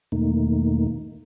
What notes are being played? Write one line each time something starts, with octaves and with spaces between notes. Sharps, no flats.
E2 B2 D#3 A3 A#3 D#4